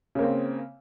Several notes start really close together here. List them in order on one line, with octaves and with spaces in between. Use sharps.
C#3 A#3 C4